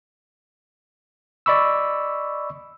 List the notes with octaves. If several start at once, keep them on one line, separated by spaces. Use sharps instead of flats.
D5 D#5 B5 C#6 E6